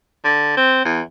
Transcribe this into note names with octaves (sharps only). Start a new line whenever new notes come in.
D3
C4
E2